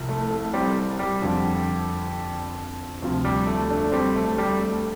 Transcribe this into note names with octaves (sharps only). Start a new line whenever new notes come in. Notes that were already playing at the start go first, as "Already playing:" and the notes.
Already playing: C2 C3 F3
A3
A3
G3 C4
G3
F2 D3 F3
D2 C3 F3
G3
A3
A3 D4
G3 C4
A3
G3
A3